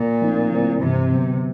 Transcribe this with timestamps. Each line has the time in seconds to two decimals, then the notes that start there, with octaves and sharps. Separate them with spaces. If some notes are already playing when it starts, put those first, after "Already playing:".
Already playing: A#2
0.21 F3 A3 C4 D#4
0.52 D3 F#3 A3 C4 E4
0.81 G2 C3 E3 G#3 C4
1.11 D3 F#3 B3